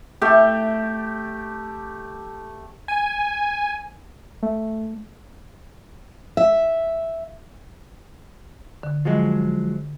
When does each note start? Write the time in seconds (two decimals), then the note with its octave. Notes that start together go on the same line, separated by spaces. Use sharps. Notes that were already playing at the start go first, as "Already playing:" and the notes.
0.21 A3 G4
2.88 G#5
4.43 A3
6.37 E5
8.83 D3
9.05 F3 F#3 G#3